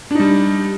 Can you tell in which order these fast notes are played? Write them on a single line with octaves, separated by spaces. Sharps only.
D4 D#4 G3